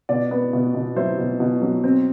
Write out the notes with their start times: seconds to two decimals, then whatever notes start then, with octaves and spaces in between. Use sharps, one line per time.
0.09 B2 D5
0.31 B3
0.53 B2
0.74 B2
0.96 F#3 C5 E5
1.18 B2
1.40 B2
1.62 F#3
1.84 C4